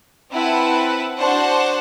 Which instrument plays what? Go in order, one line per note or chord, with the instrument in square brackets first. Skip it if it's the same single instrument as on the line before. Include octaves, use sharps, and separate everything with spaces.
[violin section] C4 E4 B4 F#5 A5
D4 F#4 C5 F#5 A5